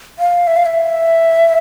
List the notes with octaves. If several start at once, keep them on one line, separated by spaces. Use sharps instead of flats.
F5
E5
F5
E5